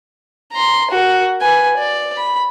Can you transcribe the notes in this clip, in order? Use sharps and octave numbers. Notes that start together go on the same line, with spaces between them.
A#5 C6
F#4 A#4
B4 G#5
D5
B5